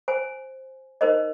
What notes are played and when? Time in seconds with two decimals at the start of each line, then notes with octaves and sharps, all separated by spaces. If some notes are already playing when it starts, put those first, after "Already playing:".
0.08 C5 G#5
1.01 D#4 A#4 C5 D#5